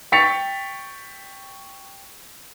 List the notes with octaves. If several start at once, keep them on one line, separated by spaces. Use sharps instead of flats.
G5 C#6 A6 B6 C#7 F7